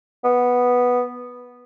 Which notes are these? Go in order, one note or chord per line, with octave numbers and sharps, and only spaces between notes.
B3